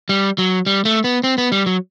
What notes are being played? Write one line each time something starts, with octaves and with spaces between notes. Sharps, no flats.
G3
F#3
G3
A3
B3
C4
B3
G3
F#3